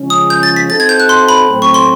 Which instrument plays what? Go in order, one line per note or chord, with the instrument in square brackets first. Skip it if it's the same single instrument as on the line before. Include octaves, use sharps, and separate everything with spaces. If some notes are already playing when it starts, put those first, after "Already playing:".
Already playing: [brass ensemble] C#3 F3 G#3 C#4
[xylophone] D#6
G6
A6
B6
[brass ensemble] C4 D#4 F#4 A4 C5 [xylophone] A6
[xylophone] G#6
G6
F#6
C6
B5
[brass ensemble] A2 F#3 A3 C4
[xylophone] C#6
C6